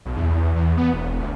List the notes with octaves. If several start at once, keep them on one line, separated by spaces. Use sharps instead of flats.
B1
E2
E2
B3
E1
D2